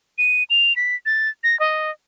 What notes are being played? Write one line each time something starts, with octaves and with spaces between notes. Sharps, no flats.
D#7
F7
B6
A6
A#6
D#5